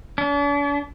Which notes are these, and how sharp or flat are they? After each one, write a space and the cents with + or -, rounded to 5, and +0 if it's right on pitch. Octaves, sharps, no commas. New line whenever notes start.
D4 -45